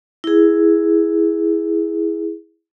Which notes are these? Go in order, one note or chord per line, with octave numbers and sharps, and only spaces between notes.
E4 G#4